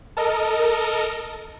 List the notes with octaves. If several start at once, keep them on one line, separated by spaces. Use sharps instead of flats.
A4 A#4 D#5